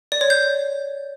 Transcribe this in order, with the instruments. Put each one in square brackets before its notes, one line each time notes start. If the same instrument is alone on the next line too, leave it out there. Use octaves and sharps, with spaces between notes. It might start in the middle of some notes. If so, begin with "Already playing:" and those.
[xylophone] D5
C#5
G6